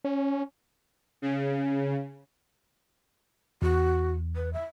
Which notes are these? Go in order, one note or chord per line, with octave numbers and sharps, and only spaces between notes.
C#4
C#3
E2 F#4
B4
E5